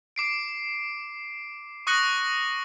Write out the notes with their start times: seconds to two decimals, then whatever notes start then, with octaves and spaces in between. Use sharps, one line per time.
0.16 D6 C7 D7
1.87 C#6 D#6 F#6 A#6 C#7 F#7